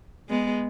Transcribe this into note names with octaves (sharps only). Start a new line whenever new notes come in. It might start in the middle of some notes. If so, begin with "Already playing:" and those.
G#3 B3